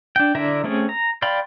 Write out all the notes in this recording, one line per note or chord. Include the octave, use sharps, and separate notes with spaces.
D4 G5
D3 D4 E4 A#4 E5
A3 C4 C#4 G#4
A#5
D5 F5 G5 B5 C6